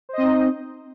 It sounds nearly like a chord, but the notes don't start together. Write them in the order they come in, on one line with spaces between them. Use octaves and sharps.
C5 D#5 C4 D#4